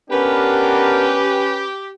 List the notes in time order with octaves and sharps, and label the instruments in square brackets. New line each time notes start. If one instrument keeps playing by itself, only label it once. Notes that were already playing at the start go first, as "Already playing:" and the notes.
[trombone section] B3 D4 A#4 [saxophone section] C#4 B4 [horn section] G4